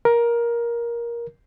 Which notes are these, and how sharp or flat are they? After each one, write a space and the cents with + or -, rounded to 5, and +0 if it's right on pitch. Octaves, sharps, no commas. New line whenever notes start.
A#4 +15